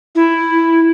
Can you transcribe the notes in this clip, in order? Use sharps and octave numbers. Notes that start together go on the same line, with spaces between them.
E4